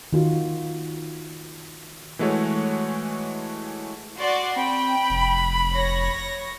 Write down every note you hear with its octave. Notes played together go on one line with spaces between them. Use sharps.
D#3 F4 F#4
E3 G#3 A3 F#4 C#5
F#4 D5 C6
C4 G5 B5
F1
C#5 A#6